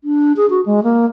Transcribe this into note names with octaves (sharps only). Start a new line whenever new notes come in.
D4
G#4
F#4
G#3
A#3